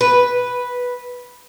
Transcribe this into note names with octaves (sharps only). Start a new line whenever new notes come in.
B4